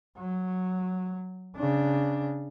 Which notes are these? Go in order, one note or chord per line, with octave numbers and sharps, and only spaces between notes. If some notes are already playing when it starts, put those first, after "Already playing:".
F#3
C#3 D4